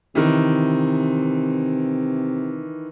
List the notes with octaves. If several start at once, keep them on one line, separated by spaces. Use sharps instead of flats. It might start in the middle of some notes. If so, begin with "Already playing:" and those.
C3 D#3 E3